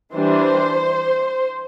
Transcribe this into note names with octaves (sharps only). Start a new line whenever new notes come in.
E3 G3 D4 C5